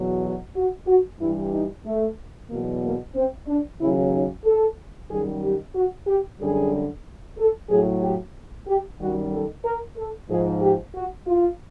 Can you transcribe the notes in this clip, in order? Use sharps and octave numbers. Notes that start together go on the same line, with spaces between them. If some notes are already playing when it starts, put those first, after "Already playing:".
Already playing: E2 B2 F#3
F#4
F#4
F#4
G2 E3 G3 E4
D#4
A3
E2 B2 F#3 A#3
A#3
C4
D4
D#2 C#3 F#3 E4
D#4
A4
F#2 D#3 G3 G#4
G4
F#4
G4
F#2 D3 G3 G#4
A4
A2 F#3 G#4
G4
G4
F#2 D#3 G3 F#4
A4
A#4
A4
G#2 F3 G#4
G4
F#4
F4